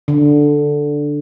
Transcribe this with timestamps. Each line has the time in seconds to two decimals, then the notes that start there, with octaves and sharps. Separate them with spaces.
0.08 D3